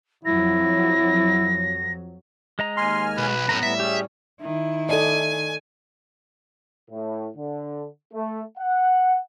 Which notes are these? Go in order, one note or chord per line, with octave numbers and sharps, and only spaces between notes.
F2 F#3 E4 A#6
G#3 D#5 A#5
D#2 G#5 C6 F6
B1 B4
F#2 A2 B3 A#5
A2 G3 E5
C#4 G4 G#4
D#3 E4
A4 D5 D#5 G#5
A2
D3
A3
F#5